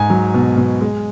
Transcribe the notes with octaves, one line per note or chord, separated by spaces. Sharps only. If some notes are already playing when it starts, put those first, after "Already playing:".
Already playing: G#2 G#5
F#3
B2
B2
G#3